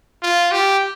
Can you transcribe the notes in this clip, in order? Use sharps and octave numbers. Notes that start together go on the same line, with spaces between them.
F4
G4